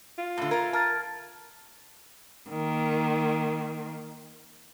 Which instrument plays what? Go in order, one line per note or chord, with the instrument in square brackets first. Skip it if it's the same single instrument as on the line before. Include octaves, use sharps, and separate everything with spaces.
[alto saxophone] F4
[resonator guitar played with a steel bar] A2 D3
[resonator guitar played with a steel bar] A3 A#4 [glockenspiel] G#6
[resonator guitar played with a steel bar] A#4 [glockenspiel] A5 F6 A6
[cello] D#3 A#3